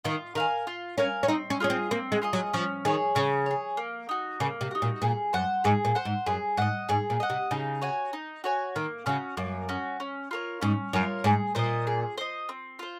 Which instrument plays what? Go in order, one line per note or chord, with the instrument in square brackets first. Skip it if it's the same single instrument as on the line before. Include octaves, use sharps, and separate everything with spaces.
[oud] D#3 [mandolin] F4
[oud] D#3 [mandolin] A#4 F5 G#5
[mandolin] F4
[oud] C#4 [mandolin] A#4 F5 G#5
[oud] C#4
[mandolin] C4 [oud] D#4
[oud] C#4
[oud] C#4 [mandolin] F4 G#4 D#5
[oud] C4
[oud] A#3 [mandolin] C4
[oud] G#3
[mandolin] F4 G#4 D#5
[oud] F#3
[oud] F3 [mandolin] C#4
[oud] D#3 [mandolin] G#4 C#5
[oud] C#3 [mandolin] C#4
[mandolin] G#4 C#5
A#3
D#4 F#4
[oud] C#3 [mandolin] A#3
[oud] C3
[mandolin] D#4 F#4
[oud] A#2
[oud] A#2 [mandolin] G#4
[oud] F#2 [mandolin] C5 F#5
[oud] G#2 [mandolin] G#4
[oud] A#2
[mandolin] C5 F#5
[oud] G#2
[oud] F#2 [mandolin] G#4
[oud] G#2 [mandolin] D#5 F#5
[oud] G#2 [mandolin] G#4
[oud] A#2
[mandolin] D#5 F#5
[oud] C3
[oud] C#3 [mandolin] D#4
[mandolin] F#4 C#5 G#5
D#4
F#4 C#5 G#5
[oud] D#3 [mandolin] A#3
[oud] C#3 [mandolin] C#4 F#4
[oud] F#2 [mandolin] A#3
[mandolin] C#4 F#4
C#4
F4 A#4 C#5
[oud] G#2 [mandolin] C#4
[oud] F#2 [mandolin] F4 A#4 C#5
[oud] G#2 [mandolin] G#4
[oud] A#2 [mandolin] C5 D#5
[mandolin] G#4
C5 D#5
C4
F4 C5